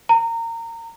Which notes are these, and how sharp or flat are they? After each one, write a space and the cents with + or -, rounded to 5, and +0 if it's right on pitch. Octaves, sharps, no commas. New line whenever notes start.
A#5 -25